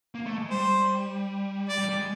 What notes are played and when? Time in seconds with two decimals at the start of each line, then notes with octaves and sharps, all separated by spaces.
0.15 A#3
0.26 A3
0.38 G#3
0.50 G3 C5
1.69 D5
1.79 G3
1.89 G3
1.99 G#3